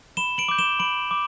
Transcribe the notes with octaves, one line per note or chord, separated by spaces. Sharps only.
B5 E7 G7
D7 F#7
D6 G6
E7 G7
B5 D7 F#7
D6